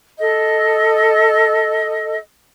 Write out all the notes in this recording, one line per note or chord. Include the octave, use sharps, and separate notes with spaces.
A4 D#5